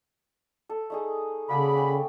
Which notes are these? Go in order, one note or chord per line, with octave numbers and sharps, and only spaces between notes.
A4
A3 D#4 G#4
C#3 A#3 F#4 G#4 A4 D5 B5
C#4 G5